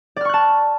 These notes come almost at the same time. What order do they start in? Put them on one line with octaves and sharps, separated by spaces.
D5 F6 C#6 F#6 A5